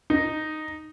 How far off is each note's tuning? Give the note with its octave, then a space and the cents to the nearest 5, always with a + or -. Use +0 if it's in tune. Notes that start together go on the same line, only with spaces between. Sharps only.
D#4 -5